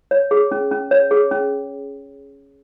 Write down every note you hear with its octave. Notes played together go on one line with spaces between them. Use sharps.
C#5
G#4
C#4
C#4
C#5
G#4
C#4